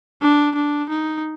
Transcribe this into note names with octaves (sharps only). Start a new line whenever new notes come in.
D4
D4
D#4